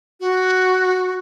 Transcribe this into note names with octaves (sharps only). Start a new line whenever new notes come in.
F#4